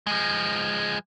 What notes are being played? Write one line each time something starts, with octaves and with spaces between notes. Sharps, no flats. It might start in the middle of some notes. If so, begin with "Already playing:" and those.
F3 G#3